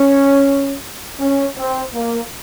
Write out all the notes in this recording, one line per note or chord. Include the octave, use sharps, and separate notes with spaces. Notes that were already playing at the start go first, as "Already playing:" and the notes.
Already playing: C#4
C#4
C4
A#3